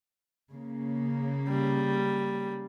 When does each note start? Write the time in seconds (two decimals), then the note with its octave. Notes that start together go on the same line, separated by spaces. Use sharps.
0.52 C#3 A#3
1.49 G3